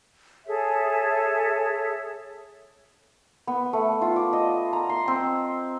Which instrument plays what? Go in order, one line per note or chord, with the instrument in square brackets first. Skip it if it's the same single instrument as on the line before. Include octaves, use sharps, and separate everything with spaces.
[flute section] G#4 A4 C#5 E5
[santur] B3
A3
F4
D6
D#5
A#5
C6
C4